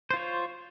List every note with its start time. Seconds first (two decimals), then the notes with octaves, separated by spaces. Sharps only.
0.10 C5
0.14 F4
0.17 C#5